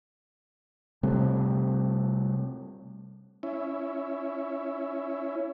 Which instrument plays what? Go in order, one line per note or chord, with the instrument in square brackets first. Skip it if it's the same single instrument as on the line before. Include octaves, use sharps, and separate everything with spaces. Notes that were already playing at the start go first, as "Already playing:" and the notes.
[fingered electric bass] C3 G3 A3
[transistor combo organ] C#4 E4